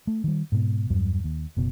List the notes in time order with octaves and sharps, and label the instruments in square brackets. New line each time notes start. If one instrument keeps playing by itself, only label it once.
[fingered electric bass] A3
D#3 G3
G#2 B2
E2 G2 F#3
D#2
F#1 B2